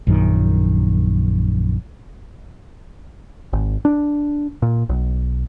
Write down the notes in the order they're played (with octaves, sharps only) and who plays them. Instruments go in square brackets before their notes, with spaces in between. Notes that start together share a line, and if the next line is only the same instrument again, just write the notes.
[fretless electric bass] A#1 F#2 D#3
[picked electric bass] G#1
D4
A#2
B1